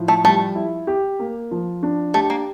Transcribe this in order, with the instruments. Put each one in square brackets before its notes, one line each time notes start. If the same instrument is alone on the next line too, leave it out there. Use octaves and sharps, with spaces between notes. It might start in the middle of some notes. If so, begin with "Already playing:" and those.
Already playing: [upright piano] A2 F3
[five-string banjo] A3
[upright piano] G3 [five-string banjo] A3
[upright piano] E4
G4
A#3
F3
D4
[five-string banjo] A3 [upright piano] G4
[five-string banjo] A#3